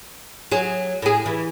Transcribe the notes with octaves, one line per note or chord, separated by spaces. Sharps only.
F#3 G#4
A2 G#4
E3